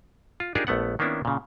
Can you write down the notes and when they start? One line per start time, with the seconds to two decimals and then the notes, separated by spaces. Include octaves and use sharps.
0.40 F4
0.55 D4 D#4 F4 G4 G#4 A#4
0.67 A#1 A3 B3 F#5
0.99 D#3 A#3 B3 C#4 D4 E4
1.25 A#2 C#3